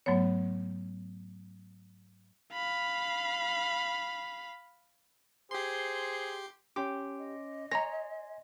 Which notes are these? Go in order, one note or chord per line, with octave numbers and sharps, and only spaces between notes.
G#2 F#3 A3 B3 C#5
F5 B5
G4 G#4 C5 C6
C#4 G4 C6 D6
D#5
C#5 G#5 A#5 C6 A#6